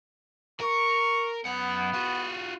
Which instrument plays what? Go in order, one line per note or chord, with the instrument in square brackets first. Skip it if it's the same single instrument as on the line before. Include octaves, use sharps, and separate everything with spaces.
[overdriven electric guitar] A#4 [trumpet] C#6
[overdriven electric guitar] F#2 F#5 [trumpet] B3
[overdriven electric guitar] F4 F#4